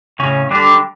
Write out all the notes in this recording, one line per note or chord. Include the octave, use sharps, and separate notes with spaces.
A2 C#3 C#4
D3 G3 D4